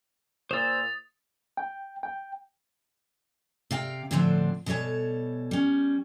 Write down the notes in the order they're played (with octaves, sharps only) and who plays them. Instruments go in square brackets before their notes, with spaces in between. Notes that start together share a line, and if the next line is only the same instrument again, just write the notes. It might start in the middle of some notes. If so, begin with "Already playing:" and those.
[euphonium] A#2 [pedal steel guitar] C5 E6 [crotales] D#6 A6
[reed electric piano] G5
G5
[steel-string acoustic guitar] C3 F5 G5
A2 D3 F3 C4 D4
B2 G3 A4 C#5 G#5
G3 C#4